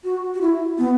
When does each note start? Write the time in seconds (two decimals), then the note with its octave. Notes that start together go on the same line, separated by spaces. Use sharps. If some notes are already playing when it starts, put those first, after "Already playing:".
0.04 F#4
0.34 F#4
0.41 E4
0.78 B3